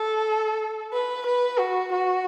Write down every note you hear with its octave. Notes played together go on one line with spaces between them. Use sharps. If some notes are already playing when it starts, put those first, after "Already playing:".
Already playing: A4
B4
B4
F#4
F#4